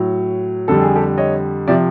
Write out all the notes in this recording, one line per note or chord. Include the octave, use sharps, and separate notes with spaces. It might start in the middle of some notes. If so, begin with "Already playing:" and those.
Already playing: A2 F#3
F2 D3 G3 A4
G#4
G4 A4
C#5 D#5
C3 F3 D5 E5